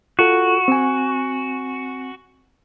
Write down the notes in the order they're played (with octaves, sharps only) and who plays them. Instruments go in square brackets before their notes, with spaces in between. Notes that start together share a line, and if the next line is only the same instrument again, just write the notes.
[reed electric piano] F4 A4 [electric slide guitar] F#4
[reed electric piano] C4 G#5